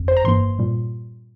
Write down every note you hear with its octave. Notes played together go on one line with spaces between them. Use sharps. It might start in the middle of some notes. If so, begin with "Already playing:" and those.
Already playing: G1 F2
C5
A#5
G2 E3 A#3 C6
A#2 G3